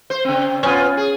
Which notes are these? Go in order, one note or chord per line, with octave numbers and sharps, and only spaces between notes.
C5
C#3 C4
B3 C#4 F4
G#4